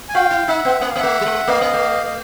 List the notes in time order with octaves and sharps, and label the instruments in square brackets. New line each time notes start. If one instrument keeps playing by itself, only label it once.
[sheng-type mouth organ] G#5
[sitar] F4 [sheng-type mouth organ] F5 G5
[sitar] E4
[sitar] D#4 [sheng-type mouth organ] E5 F#5
[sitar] B3
[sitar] A#3 [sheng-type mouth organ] F#5
[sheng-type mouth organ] F5
[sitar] A#3
[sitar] A3 [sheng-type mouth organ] E5 F#5
[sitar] G3
G#3
[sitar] A3 [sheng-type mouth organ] D#5 F5
[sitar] A#3
A3
[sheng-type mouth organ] D#5